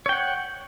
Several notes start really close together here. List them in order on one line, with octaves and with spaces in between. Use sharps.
C#5 G5 F#5